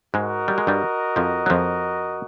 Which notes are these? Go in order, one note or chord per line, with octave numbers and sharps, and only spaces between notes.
G#2 G#3 F#4 A#4 D#5
G3
G#3
G2 G3
F2 F3
F#3
F2 F3